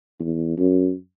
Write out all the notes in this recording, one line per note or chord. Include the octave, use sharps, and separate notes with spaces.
E2
F#2